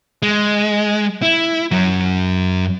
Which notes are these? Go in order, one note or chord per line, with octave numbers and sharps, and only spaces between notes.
G#3
E4
F#2 F#3